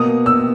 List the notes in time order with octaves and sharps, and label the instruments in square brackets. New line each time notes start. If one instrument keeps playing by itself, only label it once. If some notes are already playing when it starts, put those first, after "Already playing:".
Already playing: [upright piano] B2 A#3 D#6
E6